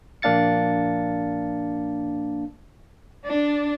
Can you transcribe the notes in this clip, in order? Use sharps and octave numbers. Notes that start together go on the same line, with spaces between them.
A#1 A#3 D4 F5 A6 C#7
D4